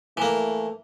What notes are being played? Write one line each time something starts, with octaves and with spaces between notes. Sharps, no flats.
E3 A3 A#3